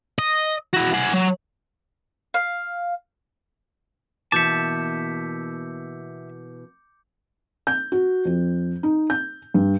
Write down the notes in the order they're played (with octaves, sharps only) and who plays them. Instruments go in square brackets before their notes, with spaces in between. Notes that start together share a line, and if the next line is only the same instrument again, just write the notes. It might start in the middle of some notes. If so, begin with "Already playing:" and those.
[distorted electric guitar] D#5
E4 F#4
G#4 F#5
F#3
[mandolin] F5
[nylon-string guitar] B2 E3 A#3 [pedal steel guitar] E5 A5 [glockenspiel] D6 G6 C#7
[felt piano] G6
F#4
F2
D#4
G6
G2